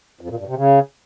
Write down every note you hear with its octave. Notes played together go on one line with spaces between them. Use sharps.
F2
A#2
G2
C3
C#3